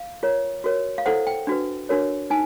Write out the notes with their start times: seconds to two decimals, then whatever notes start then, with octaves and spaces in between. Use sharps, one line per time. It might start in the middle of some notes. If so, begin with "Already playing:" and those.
Already playing: F5
0.23 F4 A#4 C#5
0.64 F#4 A#4 C#5
0.98 F5
1.06 E4 A4 C5 F#5
1.27 G5
1.47 D4 F#4 B4
1.89 D4 F#4 A#4 C#5
2.30 D#4 G#5